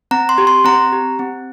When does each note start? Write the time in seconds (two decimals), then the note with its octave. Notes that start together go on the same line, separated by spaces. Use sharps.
0.11 C4 A#5
0.29 C6
0.38 G4
0.47 C6
0.64 C4 A#5
0.93 G4
1.19 C4